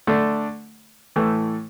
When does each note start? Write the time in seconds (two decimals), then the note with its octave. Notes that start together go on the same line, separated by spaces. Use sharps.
0.07 D3 A3 D4
1.16 A2 E3 A3